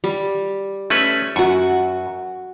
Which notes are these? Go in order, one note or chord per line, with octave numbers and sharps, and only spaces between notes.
G3
A3 C#4 B4 E5
F#2 F#4 C#6